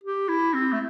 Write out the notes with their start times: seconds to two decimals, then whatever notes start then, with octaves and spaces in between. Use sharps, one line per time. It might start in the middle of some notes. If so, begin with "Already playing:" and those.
0.04 G4
0.29 E4
0.54 C4
0.73 A3